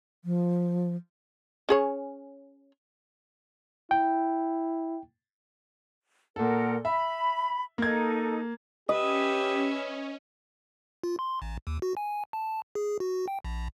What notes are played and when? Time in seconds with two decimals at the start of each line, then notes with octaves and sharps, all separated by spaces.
0.25 F3
1.69 C#4 G#4 C#5
3.91 E4 G5
6.36 A#2 A4 A#4 F#5
6.85 E5 B5
7.78 A#3 D#4 A4 G#6
8.89 C#4 G4 B4 D#5 E5
11.04 F4
11.19 C6
11.42 A1
11.67 D#2
11.82 F#4
11.97 G#5
12.33 A5
12.75 G#4
13.00 F#4
13.28 G5
13.44 A#1